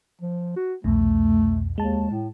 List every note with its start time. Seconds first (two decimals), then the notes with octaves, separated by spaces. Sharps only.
0.22 F3
0.56 F#4
0.84 C2 F2 B2 A3
1.78 D#2 G#3 A5
2.11 A2